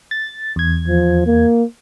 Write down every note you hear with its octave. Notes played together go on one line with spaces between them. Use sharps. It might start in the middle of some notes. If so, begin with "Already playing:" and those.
A6
E2 G#6
F3
A#3